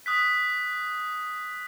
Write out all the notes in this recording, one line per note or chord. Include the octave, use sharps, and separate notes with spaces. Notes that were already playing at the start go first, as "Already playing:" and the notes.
D#6 F#6 B6